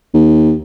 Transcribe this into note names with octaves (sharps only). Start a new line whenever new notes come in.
D#2